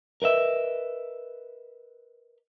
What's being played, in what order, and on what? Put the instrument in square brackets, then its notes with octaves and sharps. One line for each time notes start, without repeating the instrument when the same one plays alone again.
[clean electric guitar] A#4 B4 D#5 E5